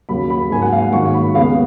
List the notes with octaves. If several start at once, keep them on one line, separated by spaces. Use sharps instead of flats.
D#2 C#3 F#3 B5
B5
G#2 F#3 A#3 G#5
F#5
F5
F#5
G#2 D#3 F#3 A#3 C#6
B5
D#2 C#3 G#3 B3 F5